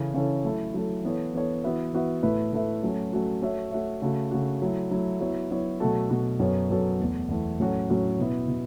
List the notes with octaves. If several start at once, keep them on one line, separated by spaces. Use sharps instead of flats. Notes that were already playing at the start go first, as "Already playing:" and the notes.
Already playing: C#3 E3 C#4 A4
C#3 E3 C#4 A4
F#3 A3 E4 A4
F#3 A3 E4 A4
E3 B3 A4 C#5
E3 B3 A4 C#5
E3 B3 F#4 B4 E5
E3 B3 F#4 B4 E5
A2 A3 E4 B4 E5
A2 A3 E4 B4 E5
F#3 A3 C#4 F#4
F#3 A3 C#4 F#4
A3 F#4 C#5 E5
A3 F#4 C#5 E5
C#3 A3 F#4
C#3 A3 F#4
F#3 A3 E4
F#3 A3 E4
F#3 B3 E4 C#5
F#3 B3 E4 C#5
B2 F#3 A3 F#4 A4
B2 F#3 A3 F#4 A4
F#2 F#3 B3 A4 C#5
F#2 F#3 B3 A4 C#5
E2 E3 A3
E2 E3 A3
A2 F#3 C#4 F#4 A4
A2 F#3 C#4 F#4 A4
B2 B3 E4
B2 B3